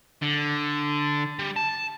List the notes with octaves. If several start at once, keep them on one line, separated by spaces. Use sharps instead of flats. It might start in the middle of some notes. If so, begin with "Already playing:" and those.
D3
G3
A5